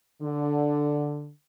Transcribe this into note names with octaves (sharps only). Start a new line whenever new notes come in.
D3